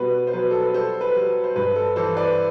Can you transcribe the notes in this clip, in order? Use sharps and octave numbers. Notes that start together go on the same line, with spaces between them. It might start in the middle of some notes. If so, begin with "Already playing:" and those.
Already playing: B2 G3 B4
C5
F#3 B4
A4
B4
G3 A4 C5
B4
G3
C5
G2 B4
A4
E3 A4 C5
B4 D5